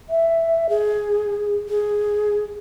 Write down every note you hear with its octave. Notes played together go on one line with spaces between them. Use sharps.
E5
G#4
G#4